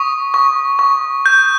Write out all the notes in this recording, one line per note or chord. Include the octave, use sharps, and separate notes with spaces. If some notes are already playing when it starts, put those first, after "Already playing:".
Already playing: C#6 D#6
C#6
C#6
G6